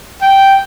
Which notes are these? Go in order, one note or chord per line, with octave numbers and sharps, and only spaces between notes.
G5